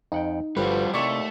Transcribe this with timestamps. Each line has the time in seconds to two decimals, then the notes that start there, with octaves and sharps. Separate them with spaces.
0.12 F2 D#4 F#5 G5
0.57 G1 F3 G3 F#4 B4
0.94 D#2 C3 A3 E4 D5 C#6